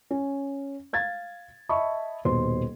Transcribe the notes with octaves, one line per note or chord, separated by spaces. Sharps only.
C#4
F5 G#6 A6
D#5 E5 A5 B5 C#6
D#1 B2 C5 C6